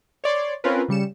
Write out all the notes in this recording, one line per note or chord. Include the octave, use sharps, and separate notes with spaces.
C#5 D5 C6
C4 C#4 F4 A#4 B4
C#3 G3 C#7 E7